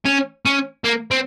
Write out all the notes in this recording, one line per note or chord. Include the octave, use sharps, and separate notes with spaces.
C#4
C#4
A#3
C4